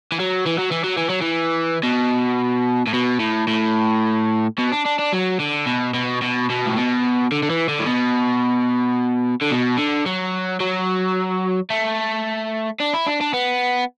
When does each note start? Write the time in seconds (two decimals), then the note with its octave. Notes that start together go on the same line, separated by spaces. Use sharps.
0.12 E3
0.20 F#3
0.47 E3
0.59 F#3
0.72 E3
0.84 F#3
0.97 E3
1.09 F#3
1.21 E3
1.83 B2
2.87 A2
2.94 B2
3.20 A2
3.48 A2
4.58 B2
4.72 D4
4.85 D4
4.99 D4
5.12 F#3
5.40 D3
5.66 B2
5.94 B2
6.22 B2
6.50 B2
6.66 A2
6.77 B2
7.32 D3
7.43 D3
7.50 E3
7.69 D3
7.79 A2
7.86 B2
9.41 D3
9.51 B2
9.78 D3
10.06 F#3
10.60 F#3
11.70 A3
12.80 D4
12.94 E4
13.06 D4
13.21 D4
13.33 B3